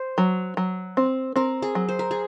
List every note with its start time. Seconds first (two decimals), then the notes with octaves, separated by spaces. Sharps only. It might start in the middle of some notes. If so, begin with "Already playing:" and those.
Already playing: C5
0.18 F#3
0.57 F#3
0.97 C4
1.36 C4 A#4
1.62 G#4
1.75 F#3
1.89 C5
1.99 A#4
2.11 G#4